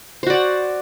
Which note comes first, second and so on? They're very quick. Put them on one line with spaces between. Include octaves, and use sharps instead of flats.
C5 F#4 D5 F#5